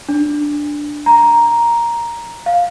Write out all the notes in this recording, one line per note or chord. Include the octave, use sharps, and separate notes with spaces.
D4
A#5
F5